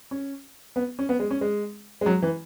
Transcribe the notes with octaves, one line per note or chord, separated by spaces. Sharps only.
C#4
B3
C#4
B3
G#3
C#4
G#3
G#3
F#3
E3